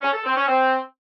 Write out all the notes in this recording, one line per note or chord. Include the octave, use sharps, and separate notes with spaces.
C#4
A4
C4
C#4
C4